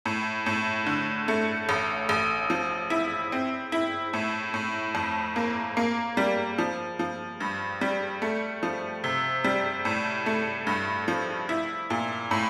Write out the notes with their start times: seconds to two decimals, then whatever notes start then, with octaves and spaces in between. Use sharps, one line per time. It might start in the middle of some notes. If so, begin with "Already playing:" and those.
0.05 A2
0.46 A2
0.86 D3
1.28 A3
1.69 A1
2.09 A1
2.50 F3
2.90 E4
3.32 C4
3.72 E4
4.13 A2
4.54 A2
4.95 F2
5.36 A#3
5.77 A#3
6.17 G3
6.58 F3
6.99 F3
7.40 G2
7.81 G3
8.22 A3
8.63 F3
9.04 C3
9.44 G3
9.85 A2
10.26 A3
10.67 G2
11.08 F3
11.49 E4
11.90 A#2
12.31 A2